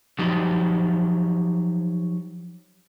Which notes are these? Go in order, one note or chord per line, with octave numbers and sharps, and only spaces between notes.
F3 F#3 D#4 G4